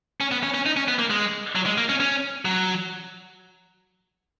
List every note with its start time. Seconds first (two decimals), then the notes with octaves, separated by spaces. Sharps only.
0.21 C#4
0.32 B3
0.43 C#4
0.54 C#4
0.66 D#4
0.77 C#4
0.88 B3
0.99 A#3
1.10 G#3
1.55 F#3
1.66 G#3
1.78 A#3
1.89 C#4
2.00 C#4
2.45 F#3